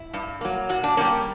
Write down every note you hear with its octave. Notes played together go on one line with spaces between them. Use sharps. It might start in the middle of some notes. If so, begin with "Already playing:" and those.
Already playing: E4
G2
F#3 A#3
A#2 F#4
D4
G3 A#3 C#4